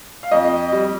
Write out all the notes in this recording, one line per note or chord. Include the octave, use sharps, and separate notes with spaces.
F5
F2 D#5
G3